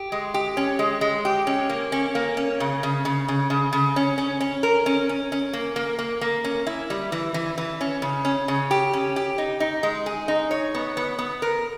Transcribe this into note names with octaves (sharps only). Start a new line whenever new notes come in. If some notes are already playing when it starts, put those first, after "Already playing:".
Already playing: G4
G#3
G4
C#4
G#3
G#3
G4
C#4
A#3
C#4
A#3
C#4
C#3
C#3
C#3
C#3
C#3
C#3
C#4
C#4
C#4
A#4
C#4
C#4
C#4
A#3
A#3
A#3
A#3
C#4
E4
G3
E3
E3
E3
C#4
C#3
C#4
C#3
G4
C#4
G4
D#4
D#4
G#3
G#4
D#4
C#5
B3
B3
B3
A#4